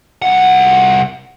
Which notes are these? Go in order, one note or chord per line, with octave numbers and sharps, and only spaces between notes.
C2 F#5